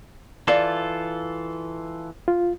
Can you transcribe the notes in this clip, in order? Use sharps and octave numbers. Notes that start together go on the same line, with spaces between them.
E3 F4 A4 D5 F5
F4